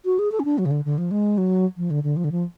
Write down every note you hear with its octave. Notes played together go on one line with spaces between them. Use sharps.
F#4
G#4
A4
C#4
D4
F#3
C#3
D3
D3
F3
G#3
F#3
F3
D3
D3
F3
D3
F3